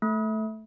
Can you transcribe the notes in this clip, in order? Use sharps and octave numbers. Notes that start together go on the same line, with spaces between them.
A3